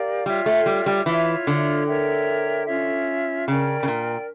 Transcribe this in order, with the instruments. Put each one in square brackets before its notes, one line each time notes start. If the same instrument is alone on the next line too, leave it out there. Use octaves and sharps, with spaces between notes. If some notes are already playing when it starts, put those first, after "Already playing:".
Already playing: [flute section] G4 A#4 D5 F5
[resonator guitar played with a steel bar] G3 [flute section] F4 C#5 E5 G5
[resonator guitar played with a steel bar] A3
G3
G3
[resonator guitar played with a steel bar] E3 [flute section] F4 C#5 E5
[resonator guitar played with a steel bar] D3
[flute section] A#4 C#5 E5 G5
C#4 F4 C#5 E5
[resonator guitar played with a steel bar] C#3 [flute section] A#4 D5 G5
[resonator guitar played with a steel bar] C#3
A#2